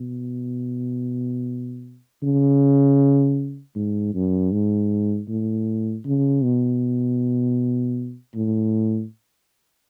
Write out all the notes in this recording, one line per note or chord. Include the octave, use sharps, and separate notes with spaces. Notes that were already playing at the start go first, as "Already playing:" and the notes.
Already playing: B2
C#3
G#2
F#2
G#2
A2
C#3
B2
A2